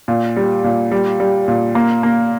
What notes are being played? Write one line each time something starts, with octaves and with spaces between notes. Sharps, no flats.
A#2
G3
A#2
G3
G3
A#2
A#3
A#3